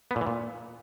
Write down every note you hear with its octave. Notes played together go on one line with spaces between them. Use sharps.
B3
A#2
E3
A#2